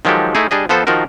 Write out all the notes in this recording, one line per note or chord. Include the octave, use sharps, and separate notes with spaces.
D#3 F3 F#3 G#3 G4 A4
A3 D#4 E4 G#4
G3 D4 G#4 D#5
F3 B3 A4 C5
D#3 F3 F4 F#4 A#4